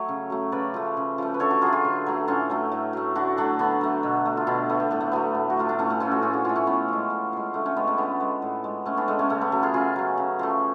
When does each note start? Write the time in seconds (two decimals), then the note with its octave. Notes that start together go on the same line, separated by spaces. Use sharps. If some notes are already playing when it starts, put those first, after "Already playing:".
Already playing: F#3 A3 A4 C#5
0.09 C#3
0.30 F#3 A3
0.52 C#3 B4 D5
0.74 F3 A3
0.97 C#3
1.18 F3 A3
1.34 B4
1.40 D3 A4 C#5
1.51 F#4 A4
1.62 F#3 A3 F4 G#4
1.73 F4 G#4
1.85 D3
2.06 F#3 A3
2.28 A2 C#4 F4
2.50 F#3 A3
2.72 A2
2.93 F#3 A3
3.15 D3 D4 F#4
3.37 F#3 A3 D4 F#4
3.59 D3 B3 D4
3.81 F#3 A3
4.03 B2
4.26 A3
4.37 F4
4.47 B2 B3 D4
4.69 A3 B3
4.80 A3
4.91 A2 B3
5.01 A3
5.12 F#3 A3 B3
5.35 A2
5.50 F#4
5.57 F#3 A3 F4
5.69 D4
5.79 A2 A3 C#4
5.90 A3 C#4
6.00 F3 A3 C#4 F4
6.11 F#4 A4
6.22 A2 F4 G#4
6.33 D4 F#4
6.45 F3 A3 C#4 F4
6.56 A3 C#4
6.67 A2 B3
6.88 F3 G#3
7.10 A2
7.33 F3 G#3
7.54 D3 A3
7.66 A3 C#4
7.77 G#3 B3
7.87 A3 C#4
7.98 D3 B3
8.20 G#3
8.42 A2
8.64 G#3
8.86 A2 A3 C#4
8.97 B3 D4
9.08 G#3 A3 C#4
9.19 A3 C#4
9.30 C#3 A3
9.42 B3
9.52 F#3 A3
9.63 F4 G#4
9.74 C#3 F4 G#4
9.96 F#3 A3
10.18 C#3
10.39 F3 A3